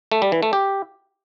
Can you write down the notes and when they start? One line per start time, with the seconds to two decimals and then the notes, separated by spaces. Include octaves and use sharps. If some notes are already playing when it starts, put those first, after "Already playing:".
0.12 A3
0.22 G3
0.32 E3
0.43 A3
0.53 G4